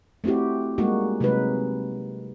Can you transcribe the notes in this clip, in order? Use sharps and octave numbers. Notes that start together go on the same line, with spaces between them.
A3 C4 E4 F#4 G4
G3 G#3 A#3 D#4 F#4
C3 F#3 G#3 D#4 B4